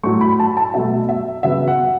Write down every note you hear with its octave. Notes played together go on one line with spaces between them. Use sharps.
A2 F#3 A3 C#6
B5
A5
A5
B2 F#3 A3 E5
E5
C#3 F#3 B3 E5
F#5